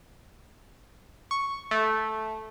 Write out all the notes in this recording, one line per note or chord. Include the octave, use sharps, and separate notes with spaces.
C#6
A3